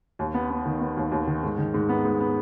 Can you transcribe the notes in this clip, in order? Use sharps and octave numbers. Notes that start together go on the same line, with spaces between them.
D#2
B3
B3
D#3
B3
D#2
D#2
D#3
G#2
D#3
G#2
B3
G#2
B3